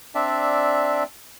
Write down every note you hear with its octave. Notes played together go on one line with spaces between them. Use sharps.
C4 D4 D5 E5